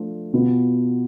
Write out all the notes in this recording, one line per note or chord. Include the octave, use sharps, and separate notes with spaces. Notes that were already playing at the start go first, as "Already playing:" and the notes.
Already playing: F3 A3 D4 F4
B2 B3 F4